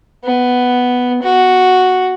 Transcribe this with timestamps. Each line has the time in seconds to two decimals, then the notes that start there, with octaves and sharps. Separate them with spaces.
0.25 B3
1.23 F#4